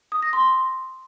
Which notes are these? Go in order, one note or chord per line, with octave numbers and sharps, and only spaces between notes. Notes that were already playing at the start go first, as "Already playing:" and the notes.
D#6
A#6
C6